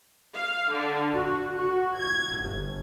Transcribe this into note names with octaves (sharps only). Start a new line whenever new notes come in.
F5
D3
F#4
F#4
G#6
G1